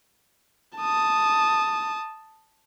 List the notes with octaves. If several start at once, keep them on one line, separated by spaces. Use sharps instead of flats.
A5 D#6